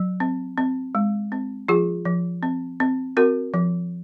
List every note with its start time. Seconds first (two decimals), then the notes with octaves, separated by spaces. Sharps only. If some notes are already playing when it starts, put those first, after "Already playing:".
Already playing: F#3
0.20 C4
0.58 C4
0.95 G#3
1.32 C4
1.68 F3 F4 G#4
2.05 F3
2.43 C4
2.80 C4
3.17 C4 F#4 A#4
3.54 F3